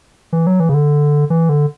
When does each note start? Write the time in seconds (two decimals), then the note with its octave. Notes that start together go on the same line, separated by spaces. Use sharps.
0.33 E3
0.47 F#3
0.60 E3
0.69 C#3
0.74 D3
1.30 E3
1.49 D3